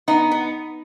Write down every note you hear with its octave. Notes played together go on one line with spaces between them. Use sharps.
B3 D#4
B3